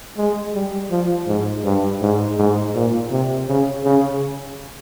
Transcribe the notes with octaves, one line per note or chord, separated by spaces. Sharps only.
G#3
G3
F3
G#2
G2
G#2
G#2
A#2
C3
C#3
C#3